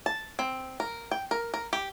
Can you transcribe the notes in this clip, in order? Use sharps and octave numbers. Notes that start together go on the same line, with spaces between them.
A5
C4
A#4
G5
A#4
A#4
G4